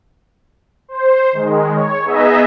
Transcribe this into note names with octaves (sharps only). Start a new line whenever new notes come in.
C5
D#3 G#3
C#5
B3 D#4 G#4 D#5 E5